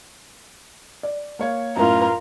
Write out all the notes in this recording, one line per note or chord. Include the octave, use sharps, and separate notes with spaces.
D5
A#3 C#5 F5
F#2 A2 F4 A#4